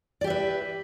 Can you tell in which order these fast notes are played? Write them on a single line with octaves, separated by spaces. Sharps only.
D5 G4 E5 B4